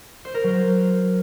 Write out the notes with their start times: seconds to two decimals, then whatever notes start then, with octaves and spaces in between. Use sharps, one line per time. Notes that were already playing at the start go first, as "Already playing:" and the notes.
0.25 C5
0.34 A#4
0.44 F#3
0.53 C5